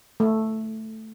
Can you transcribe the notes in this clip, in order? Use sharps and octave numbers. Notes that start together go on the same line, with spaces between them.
A3